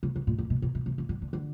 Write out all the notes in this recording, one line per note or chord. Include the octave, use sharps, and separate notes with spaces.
C#3
C#3
A#2
A#2
B2
B2
B2
C3
C#3
D3
D3
D3